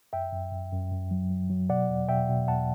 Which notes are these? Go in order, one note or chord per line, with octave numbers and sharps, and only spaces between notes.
F#2 E5 G5
F#2
F#2
F#2
F#2
F#3
F#3
F#3
B2 D5 F#5
E2
B2 E5 G5
B2
E2 F#5 A5